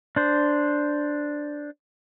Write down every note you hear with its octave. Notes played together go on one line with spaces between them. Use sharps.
D4 C5